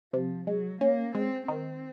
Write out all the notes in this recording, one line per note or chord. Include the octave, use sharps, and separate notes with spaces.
C3 F3
F#3 G#3
A#3 C#4
G#3 C4
D#3 C4